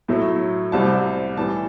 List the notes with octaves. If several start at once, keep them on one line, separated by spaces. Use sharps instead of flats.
A2 F#3 A3
C2 C3 G3 A5
A2 E3 G3 A5